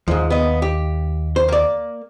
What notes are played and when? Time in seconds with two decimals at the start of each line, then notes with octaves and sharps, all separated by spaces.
0.08 D#2 G#2 F3
0.30 B3 D#5
0.62 G4
1.36 C5
1.49 A#3 D5